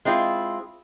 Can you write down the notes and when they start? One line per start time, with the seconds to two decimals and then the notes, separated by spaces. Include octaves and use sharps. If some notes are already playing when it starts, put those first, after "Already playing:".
0.05 G#3 C4 E4 F4